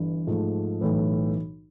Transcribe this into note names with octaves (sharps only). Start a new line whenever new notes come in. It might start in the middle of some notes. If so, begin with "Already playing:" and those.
Already playing: G1 G2 E3
G#2 F3 A3
B1 A2 E3